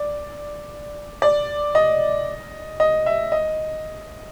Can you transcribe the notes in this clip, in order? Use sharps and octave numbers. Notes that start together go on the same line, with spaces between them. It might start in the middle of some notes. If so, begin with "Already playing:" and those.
Already playing: D5
D5
D#5
D#5
E5
D#5